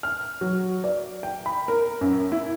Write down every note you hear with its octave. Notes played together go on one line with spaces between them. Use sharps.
F6
F#3
D5
G5
B5
A#4
F#2
E4